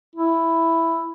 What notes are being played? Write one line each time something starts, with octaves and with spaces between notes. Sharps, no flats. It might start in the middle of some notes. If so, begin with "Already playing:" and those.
E4